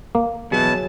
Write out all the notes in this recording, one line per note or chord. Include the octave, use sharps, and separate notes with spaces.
A#3
B2 E3 F#3 G#4 A5